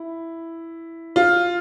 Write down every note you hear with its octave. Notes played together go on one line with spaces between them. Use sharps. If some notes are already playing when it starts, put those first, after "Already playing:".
Already playing: E4
F4